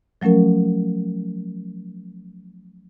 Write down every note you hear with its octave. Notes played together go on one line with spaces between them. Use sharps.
F3 F#3 A3 C#4 A#4